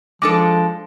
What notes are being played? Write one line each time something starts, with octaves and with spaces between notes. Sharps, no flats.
F3 G#3 D4 A4 D6